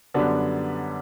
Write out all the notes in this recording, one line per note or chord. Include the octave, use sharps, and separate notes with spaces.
F#2 D3 G3 B3 D4